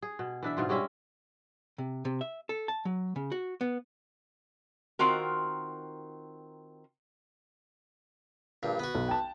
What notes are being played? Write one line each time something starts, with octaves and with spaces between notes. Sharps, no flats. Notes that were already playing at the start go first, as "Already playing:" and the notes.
G#4
B2
E3 D4 E5
G#2 B2 F4
G3 G#3 C#4 E5
C3
C3
E5
A4
A5
F#3
C#3
F#4
B3
D#3 C4 F4 F#4 A#4
A#1 G2
B3 F#4
B1
G5 A5